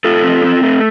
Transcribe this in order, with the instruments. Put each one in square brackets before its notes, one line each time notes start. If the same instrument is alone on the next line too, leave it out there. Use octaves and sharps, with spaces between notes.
[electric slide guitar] A3 F4 A4
C4
C4
A3